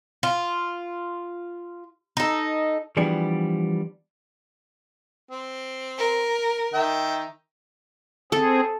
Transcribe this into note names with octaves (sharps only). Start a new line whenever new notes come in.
F4
D#4 A4
E3 F3 G3 B3 D4 G#4
C4
A#4
D#3 E5 G5
C4 G#4 A4